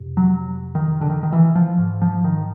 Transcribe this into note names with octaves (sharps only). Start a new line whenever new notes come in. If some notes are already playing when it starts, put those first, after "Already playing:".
Already playing: F2 C3
F#3
D#3
D3
D#3
D#3
E3
F3
G#2
F3
D#3